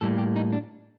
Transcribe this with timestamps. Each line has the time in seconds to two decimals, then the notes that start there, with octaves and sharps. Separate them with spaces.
0.01 A2 G3 A#3 A4
0.18 G4
0.36 D#4
0.53 D4